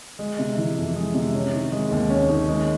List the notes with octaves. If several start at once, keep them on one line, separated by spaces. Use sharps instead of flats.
G#3
C3
E3
F2
G#3
C3
C#4
D#3
G#3
D#2
C#4
D#3
G#3